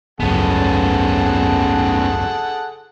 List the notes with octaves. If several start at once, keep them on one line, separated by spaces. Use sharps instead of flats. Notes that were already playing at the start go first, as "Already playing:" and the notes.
G#1 C#2 F#2 B3 C#4 G#4 A4 F#5